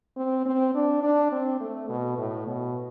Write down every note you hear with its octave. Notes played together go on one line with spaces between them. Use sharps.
C4
C4
D4
D4
C4
A3
B2
A2
B2